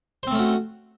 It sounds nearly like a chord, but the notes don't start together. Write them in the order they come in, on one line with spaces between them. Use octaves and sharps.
C5 C4 A3 C#4 F#4